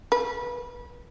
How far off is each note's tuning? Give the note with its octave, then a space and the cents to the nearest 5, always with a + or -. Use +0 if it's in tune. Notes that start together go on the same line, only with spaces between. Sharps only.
B4 -25